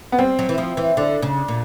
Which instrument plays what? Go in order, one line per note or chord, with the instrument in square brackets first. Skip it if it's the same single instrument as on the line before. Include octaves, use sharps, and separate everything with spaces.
[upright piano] B3
[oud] G3 [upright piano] C4
[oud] F#3
E3
F3
E3
[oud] D3 [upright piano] D4
[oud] C#3
A#2